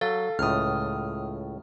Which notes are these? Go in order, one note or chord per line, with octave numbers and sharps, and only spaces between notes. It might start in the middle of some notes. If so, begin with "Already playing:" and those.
F#3 A4 F5 A6
C#2 A2 D#6 F6